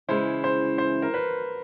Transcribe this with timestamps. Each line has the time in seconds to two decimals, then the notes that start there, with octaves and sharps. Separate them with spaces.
0.08 C#3 E3 G#3 C#4 E4 C5
0.44 C5
0.78 C5
1.02 A#4
1.14 B4